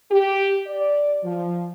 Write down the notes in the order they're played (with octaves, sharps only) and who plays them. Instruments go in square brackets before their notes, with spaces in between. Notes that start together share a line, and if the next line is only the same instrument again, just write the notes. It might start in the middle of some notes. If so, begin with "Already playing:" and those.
[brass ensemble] G4
D5
F3